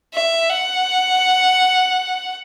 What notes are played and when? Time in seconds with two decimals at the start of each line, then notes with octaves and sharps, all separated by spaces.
0.14 E5
0.50 F#5